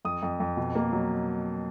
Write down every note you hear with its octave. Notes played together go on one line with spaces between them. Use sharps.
F2 D#6
F2
F2
B2
A#3
F#3